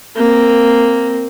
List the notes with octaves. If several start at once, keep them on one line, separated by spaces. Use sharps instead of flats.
A#3 C4